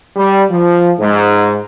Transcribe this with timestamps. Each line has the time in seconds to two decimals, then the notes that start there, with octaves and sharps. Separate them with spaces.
0.16 G3
0.50 F3
0.99 G#2